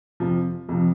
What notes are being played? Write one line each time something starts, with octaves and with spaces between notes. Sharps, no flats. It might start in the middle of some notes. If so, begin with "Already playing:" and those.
F2 C3 F3
F2 C3 F3